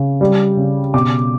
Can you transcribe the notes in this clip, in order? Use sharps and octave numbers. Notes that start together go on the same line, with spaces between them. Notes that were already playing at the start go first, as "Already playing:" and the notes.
Already playing: C#3
G3
C#3
B2 D6